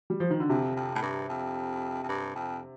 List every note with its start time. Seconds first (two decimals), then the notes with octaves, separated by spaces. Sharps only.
0.10 G3
0.20 F3
0.31 D#3
0.40 D3
0.49 F2 C3
0.76 F2
0.95 A2
1.02 G2
1.29 F2
2.03 F2
2.09 G2
2.35 F2